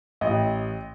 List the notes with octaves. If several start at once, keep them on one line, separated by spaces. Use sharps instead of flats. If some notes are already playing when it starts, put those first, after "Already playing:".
A1 D#5